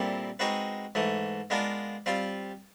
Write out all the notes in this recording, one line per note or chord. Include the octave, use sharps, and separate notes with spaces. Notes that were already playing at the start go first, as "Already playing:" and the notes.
Already playing: A#2 G3 C4 E4 A4
G#3 C4 D#4 F#4 B4
G#2 E3 A3
G#3 B3 D4 F4 A#4
G3 C4 F4